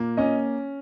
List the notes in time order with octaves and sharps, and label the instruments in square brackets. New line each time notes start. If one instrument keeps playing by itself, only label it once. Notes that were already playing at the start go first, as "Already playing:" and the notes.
Already playing: [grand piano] A#2 A#3
C#4 D#5